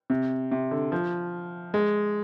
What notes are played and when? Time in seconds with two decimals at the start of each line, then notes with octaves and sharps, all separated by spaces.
0.10 C3
0.51 C3
0.71 D3
0.92 F3
1.74 G#3